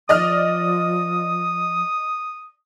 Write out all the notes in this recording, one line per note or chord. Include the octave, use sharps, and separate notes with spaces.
F3 D5 D#5 D#6 F6